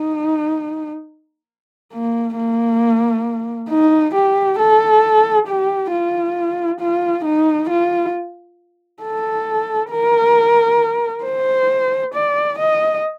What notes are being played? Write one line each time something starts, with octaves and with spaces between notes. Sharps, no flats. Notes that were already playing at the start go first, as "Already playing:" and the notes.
Already playing: D#4
A#3
A#3
D#4
G4
A4
G4
F4
F4
D#4
F4
A4
A#4
C5
D5
D#5